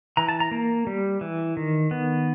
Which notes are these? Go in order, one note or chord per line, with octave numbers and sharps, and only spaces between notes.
E3 A#5
A5
A#5
A#3
G3
E3
D#3
B3